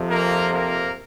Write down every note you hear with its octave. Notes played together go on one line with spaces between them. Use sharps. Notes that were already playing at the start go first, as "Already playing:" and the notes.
Already playing: F2 C3 F3
A#3 A#4
A#3 A#4